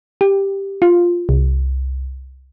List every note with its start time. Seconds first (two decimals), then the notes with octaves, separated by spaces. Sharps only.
0.21 G4
0.82 F4
1.29 C2